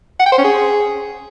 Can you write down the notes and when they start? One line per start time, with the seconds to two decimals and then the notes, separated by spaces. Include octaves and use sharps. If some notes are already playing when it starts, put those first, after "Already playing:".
0.20 F#5
0.26 G5
0.32 C5
0.38 C#4
0.44 G#4